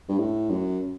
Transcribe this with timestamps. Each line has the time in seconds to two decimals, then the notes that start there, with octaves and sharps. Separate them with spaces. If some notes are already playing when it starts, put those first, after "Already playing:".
0.09 G2
0.18 A2
0.50 F#2